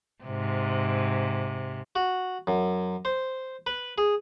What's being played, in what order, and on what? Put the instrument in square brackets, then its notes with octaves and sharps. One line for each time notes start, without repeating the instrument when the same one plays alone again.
[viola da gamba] G#2 C3
[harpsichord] F#4
F#2
C5
B4
G#4